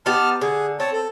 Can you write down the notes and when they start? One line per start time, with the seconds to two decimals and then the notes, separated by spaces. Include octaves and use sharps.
0.06 B3 D#4 G4 A5 F6
0.41 D3 G#4
0.80 C4 C#5 A5
0.93 A4